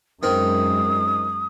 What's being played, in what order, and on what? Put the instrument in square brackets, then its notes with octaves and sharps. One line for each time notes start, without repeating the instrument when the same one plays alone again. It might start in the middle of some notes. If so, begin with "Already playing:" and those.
[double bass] F#2 G#3 [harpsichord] D#3 C4 [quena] D#6